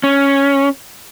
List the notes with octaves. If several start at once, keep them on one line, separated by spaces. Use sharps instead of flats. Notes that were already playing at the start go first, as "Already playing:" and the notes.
C#4